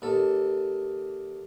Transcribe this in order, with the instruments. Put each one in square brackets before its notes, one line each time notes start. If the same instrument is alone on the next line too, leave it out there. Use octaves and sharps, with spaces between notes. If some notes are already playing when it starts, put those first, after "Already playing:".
[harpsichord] D#2 A4